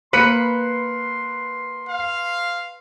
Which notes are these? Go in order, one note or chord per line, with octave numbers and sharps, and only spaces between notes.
A#3 B4 C6 F#6 C#7
F5